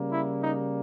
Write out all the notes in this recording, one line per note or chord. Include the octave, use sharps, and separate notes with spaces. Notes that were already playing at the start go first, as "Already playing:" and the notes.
Already playing: C#3 G3 A#3
E4
D#4